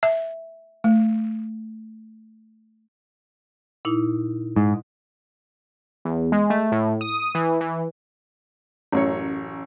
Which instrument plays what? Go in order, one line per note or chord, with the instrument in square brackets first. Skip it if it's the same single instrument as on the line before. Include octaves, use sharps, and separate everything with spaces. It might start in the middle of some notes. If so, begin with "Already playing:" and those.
[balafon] E5
A3
[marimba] A#2 D#4 E4
[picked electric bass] G#2
[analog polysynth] E2
G#3
A3
A2
D#6
E3
E3
[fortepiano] A1 F#2 C#5